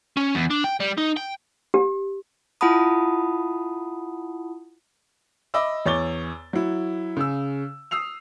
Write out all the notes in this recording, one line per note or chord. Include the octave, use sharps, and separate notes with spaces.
C#4
E2
D4
G5
G3
D#4
G5
G4
E4 F4 F#5 A5 B5 D#6
D#5 E5 B5 D6 E6
E2 C#5 D6 A6 G7
F#3 E4
C#3 E6
D#6 E6 C7 F7